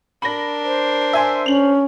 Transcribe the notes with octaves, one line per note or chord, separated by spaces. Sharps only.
D4 A#4 B5 A#6
C5
E5 G#5 C6
C#4 F7 F#7